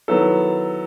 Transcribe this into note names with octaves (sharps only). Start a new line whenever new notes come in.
D#3 F#3 B3 E4 A4